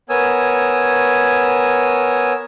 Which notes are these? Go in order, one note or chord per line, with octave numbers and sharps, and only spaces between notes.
B3 A#4 C#5 G#5 D#6 E6